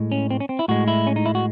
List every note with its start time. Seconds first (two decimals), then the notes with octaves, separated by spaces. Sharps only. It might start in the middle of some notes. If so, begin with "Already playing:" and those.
Already playing: A2 G#3
0.12 C#4
0.30 C4
0.40 C#4
0.49 C4
0.59 E4
0.68 A2 G#3 F#4
0.88 E4
1.07 C#4
1.16 D#4
1.26 E4
1.35 F#4